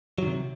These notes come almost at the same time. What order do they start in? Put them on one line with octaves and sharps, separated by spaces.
F#3 D#3 C3